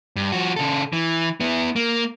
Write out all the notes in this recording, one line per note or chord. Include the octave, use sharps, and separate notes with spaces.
G2
F3 F#4
C#3 A4
E3
B3 E4
A#3